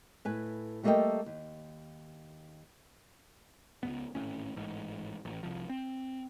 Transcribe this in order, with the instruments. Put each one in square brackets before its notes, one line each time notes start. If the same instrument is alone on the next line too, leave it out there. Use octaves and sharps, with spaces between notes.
[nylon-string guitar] A2 B4 G#5
G3 A3 A#3 A4 D#5 G5
D#2
[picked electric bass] C#2 F#2 B3
G#1 A2 C#4
A1 G#2
A1
C2 F3
C4